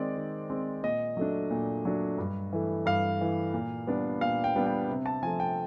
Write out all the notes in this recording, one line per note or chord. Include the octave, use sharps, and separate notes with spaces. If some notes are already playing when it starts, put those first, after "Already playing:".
Already playing: D#3 G#3 C4 D5
D#3
G#3 C4
A#2 D#5
F#3 A3 D4
A#2
F#3 A3 D4
G2
E3 A3
G2 F5
E3 A3
A#2
G3 B3 D4
A#2 F5
G5
G3 B3 D4
G5
C3
A5
F3 A3 G#5
G5